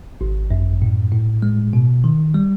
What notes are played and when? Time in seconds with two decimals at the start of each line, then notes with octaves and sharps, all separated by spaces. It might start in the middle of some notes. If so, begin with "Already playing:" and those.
0.21 G#1
0.51 F#2
0.82 A2
1.12 A2
1.42 G#3
1.73 B2
2.04 D#3
2.34 G3